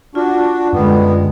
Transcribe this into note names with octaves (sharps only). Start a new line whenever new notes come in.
D4 F4 F#4
F#2 D3 G3 G#3 B3